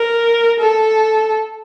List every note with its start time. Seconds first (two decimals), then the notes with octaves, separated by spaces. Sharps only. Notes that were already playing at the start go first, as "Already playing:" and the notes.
Already playing: A#4
0.59 A4